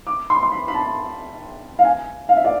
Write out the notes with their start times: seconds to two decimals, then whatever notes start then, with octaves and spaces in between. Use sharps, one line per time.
0.07 D6
0.30 C6
0.43 C6
0.52 B5
0.68 B5
0.74 A5
1.79 F5
1.85 G#5
2.29 F5
2.37 E5
2.45 D5